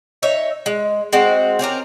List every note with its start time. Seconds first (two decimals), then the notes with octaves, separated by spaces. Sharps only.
0.23 D#4 C#5 E5
0.66 G#3
1.13 G#3 C4 F#4
1.59 C4 C#4 G4 A#4